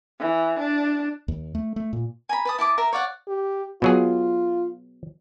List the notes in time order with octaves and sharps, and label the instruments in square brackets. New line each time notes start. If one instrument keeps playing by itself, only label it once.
[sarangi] E3
D4
[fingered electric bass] D#2
A3
A3
A#2
[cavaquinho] G#5 A#5 B5
B4 A5 D#6
E4 A5 D6 D#6
A#4 E5 A#5
C#5 D5 F5 F#5
[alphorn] G4
[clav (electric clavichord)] B2 F#3 G#4 [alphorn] F4